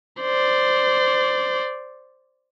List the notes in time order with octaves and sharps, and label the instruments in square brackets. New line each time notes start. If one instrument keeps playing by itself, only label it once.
[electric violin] C5 D5